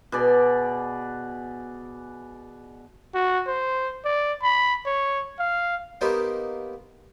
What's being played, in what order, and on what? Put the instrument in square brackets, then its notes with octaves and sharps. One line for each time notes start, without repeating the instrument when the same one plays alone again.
[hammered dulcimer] B2 G#4 D5
[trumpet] F#4
C5
D5
B5
C#5
F5
[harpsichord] A#3 B3 D#4 G4 C5